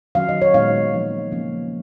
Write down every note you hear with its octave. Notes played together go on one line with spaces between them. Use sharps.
D#3 F#3 C#4 F5
D#5
C#5
A#2 G#3 B3 D#4 F5
F3 A#3 D#4
C#3 F3 A#3 C#4